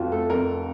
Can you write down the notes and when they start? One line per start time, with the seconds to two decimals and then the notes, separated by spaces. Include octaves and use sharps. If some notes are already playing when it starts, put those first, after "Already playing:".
Already playing: F1 F2 F4 F#4
0.12 A3 A4
0.30 F1 A#4